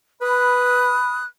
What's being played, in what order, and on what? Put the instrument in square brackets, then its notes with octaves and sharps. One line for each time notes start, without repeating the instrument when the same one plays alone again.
[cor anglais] B4 [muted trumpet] B5 [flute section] D#6 F#6